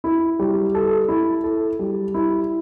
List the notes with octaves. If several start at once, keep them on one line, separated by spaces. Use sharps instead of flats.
E4
G3
A4
E4
A4
G3
E4